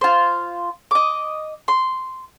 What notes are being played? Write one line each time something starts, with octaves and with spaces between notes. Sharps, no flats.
F4 C5
D#5 D6
C6